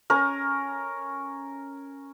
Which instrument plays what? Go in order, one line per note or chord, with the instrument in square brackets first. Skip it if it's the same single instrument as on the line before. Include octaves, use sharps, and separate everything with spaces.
[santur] C#4 A#4